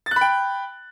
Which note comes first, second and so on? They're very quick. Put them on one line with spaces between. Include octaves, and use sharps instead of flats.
A6 F#6 B5 G5